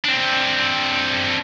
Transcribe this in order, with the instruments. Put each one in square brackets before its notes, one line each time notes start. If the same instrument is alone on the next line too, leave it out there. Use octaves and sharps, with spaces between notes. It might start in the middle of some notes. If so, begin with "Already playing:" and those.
[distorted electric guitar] C4 D4